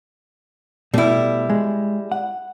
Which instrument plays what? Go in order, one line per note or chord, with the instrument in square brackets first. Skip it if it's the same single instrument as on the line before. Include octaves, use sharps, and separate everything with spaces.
[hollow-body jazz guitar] B2 A3 [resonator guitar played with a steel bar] G3 E4
[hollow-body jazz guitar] G#3
F#5